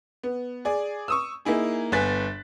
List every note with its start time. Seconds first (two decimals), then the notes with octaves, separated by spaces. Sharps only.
0.23 B3
0.65 G#4 D5
1.08 C#6 D#6 E6
1.45 A#3 D#4 E4 G#4
1.92 G1 B3 G#5 F#6 A6 B6